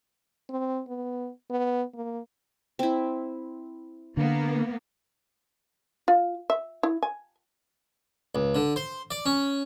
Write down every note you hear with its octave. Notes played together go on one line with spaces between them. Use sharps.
C4
B3
B3
A#3
C4 E4
D3 A#3 B3
F4
E5
E4
G#5
C#2
D3
C5
D5
C#4